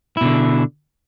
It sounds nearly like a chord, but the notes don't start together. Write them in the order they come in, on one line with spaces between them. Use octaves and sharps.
E4 B2 D3